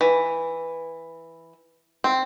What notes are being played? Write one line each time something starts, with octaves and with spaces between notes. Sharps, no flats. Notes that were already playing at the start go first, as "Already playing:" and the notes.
E3
C4